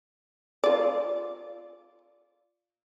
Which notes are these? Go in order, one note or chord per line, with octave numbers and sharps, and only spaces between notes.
F4 D5